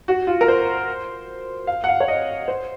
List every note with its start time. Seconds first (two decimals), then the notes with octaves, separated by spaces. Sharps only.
0.08 F#4
0.27 F4
0.41 A#4
0.48 C5
1.67 F5
1.84 F#5
1.89 F5
2.00 C#5
2.08 D#5
2.48 C5